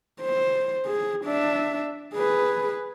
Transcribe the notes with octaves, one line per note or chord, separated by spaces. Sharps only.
C5
G#4
D4 E5
G#4 B4